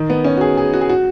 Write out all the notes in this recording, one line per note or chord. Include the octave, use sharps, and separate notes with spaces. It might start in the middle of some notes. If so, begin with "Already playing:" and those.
Already playing: D#3
B3
C#4
F#4
G#4
G#4
F#4
G#4
F#4